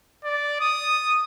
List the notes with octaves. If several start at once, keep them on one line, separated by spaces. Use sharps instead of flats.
D5
D#6